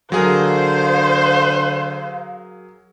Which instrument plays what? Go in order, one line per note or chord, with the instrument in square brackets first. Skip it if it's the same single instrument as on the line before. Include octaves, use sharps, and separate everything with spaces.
[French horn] D3 [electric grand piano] F#3 G#4 A#4 [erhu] C5 [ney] F5